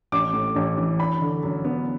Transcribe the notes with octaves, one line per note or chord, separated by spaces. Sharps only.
A1 D6
A2
A1
E3
D4 B5
D3
F#2
B3